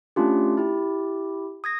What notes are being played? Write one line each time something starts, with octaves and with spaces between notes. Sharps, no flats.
A3 C#4 D4 F4 G4
E4 G4
D#6 G#6 A#6